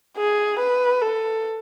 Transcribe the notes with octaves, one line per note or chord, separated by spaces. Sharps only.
G#4
B4
A4